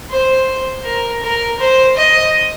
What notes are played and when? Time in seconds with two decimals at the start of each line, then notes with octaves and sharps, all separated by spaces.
0.11 C5
0.85 A#4
1.23 A#4
1.59 C5
1.97 D#5